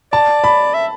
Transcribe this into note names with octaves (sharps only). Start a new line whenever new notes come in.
D5 A5
B5
E5